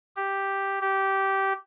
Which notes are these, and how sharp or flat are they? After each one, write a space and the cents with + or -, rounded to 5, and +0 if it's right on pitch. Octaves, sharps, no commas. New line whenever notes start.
G4 +0
G4 -15